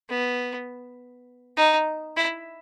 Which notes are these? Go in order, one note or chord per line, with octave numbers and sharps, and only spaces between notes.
B3
D#4
E4